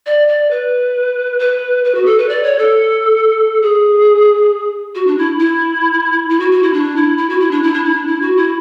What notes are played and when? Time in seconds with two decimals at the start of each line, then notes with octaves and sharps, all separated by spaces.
0.06 D5
0.28 D5
0.51 B4
1.39 B4
1.85 B4
1.95 F#4
2.06 A4
2.18 B4
2.29 D5
2.43 C#5
2.59 A4
3.62 G#4
4.95 F#4
5.07 D4
5.18 E4
5.40 E4
6.30 E4
6.40 F#4
6.52 F#4
6.63 E4
6.73 D4
6.96 E4
7.18 E4
7.29 F#4
7.40 E4
7.51 D4
7.63 E4
7.74 D4
7.84 E4
7.95 D4
8.07 E4
8.22 F#4
8.37 E4